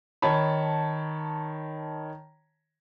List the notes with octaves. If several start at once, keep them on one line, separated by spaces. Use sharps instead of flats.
D#3 C#5 A5 B5